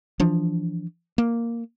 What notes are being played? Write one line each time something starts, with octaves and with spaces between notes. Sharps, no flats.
E3 F3 D4
A#3